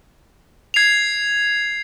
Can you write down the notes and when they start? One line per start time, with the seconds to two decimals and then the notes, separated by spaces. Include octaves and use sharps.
0.74 G#6 C7 F7